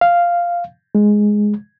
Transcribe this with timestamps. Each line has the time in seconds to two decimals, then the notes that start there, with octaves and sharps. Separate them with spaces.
0.01 F5
0.95 G#3